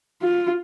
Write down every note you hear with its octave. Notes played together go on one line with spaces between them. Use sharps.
F4